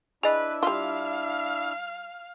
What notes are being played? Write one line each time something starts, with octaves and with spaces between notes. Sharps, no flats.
D4 E4 G#4 B4 D#5 E5 F7
G3 F4 F5